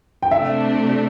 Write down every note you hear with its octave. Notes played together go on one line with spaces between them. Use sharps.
G5
C3 A3 D4 E5